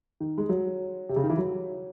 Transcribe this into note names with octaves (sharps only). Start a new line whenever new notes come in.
D#3
G#3
F#3
C3
C#3
D#3
E3
F#3